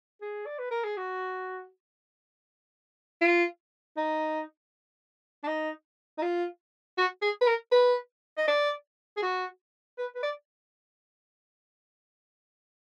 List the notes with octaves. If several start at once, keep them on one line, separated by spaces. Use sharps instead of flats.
G#4
D5
B4
A#4
G#4
F#4
F4
D#4
D4
D#4
D#4
F4
F#4
G#4
B4
A#4
B4
D#5
D5
G#4
F#4
B4
B4
D5